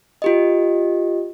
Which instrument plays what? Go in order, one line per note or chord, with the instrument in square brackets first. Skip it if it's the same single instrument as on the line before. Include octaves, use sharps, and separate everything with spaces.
[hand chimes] F4 G4 D#5